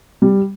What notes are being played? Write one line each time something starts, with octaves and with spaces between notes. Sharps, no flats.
G3